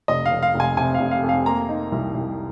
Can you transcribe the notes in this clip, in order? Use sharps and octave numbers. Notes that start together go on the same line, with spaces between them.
F1 D#5
F5
F1
F5
F1
G#5
C3 G#5
F5
F1
F5
F2
F5
A#3 A#5
D#4
C2
C2